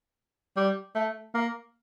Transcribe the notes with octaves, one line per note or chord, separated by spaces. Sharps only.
G3
A3
A#3